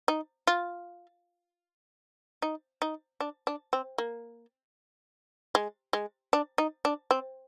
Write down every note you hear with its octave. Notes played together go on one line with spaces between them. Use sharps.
D#4
F4
D#4
D#4
D4
D4
C4
A#3
G#3
G#3
D4
D#4
D4
C4